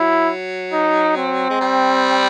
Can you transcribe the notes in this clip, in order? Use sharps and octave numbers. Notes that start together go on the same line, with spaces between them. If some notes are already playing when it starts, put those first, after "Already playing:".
Already playing: F#3 E4
D#4
C4
G#3
G3